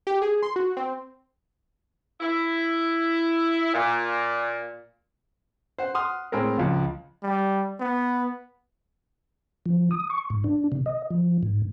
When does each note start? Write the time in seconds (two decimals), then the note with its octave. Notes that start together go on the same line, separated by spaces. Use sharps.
0.07 G4
0.22 G#4
0.43 C6
0.56 F#4
0.77 C4
2.21 E4
3.73 A#2
5.78 C5 F#5
5.94 F#5 C6 D#6 F6
6.32 A2 G#3 C4 A#4
6.58 C#2 F3
7.23 G3
7.80 B3
9.66 F3
9.91 D#6
10.10 C#6
10.30 G#2
10.44 D4
10.72 C3
10.86 D#5
11.10 F3
11.43 G#2